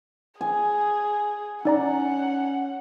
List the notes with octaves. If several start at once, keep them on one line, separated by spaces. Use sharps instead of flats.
G#4 G#5
C#4 D#4 D5 F#5 A#5